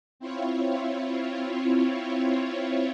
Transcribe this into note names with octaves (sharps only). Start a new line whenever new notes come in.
C4 E4 F4 C#5